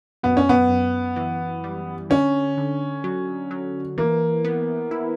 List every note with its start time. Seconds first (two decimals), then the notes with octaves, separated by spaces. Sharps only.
0.23 F#2 B3
0.37 C#4
0.49 B3
0.69 F#2
1.16 E3
1.64 G3
2.10 D3 C#4
2.57 D3
3.04 F#3
3.51 F#3
3.98 E3 A#3
4.45 B3
4.91 E4